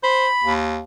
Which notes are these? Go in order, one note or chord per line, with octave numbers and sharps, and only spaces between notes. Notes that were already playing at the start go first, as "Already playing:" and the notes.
C5 B5
D#2